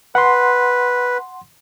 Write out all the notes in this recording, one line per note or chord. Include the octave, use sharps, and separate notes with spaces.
B4 F#5 C6